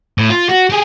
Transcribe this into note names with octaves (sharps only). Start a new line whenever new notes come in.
A2
F4
F#4
G4 G#4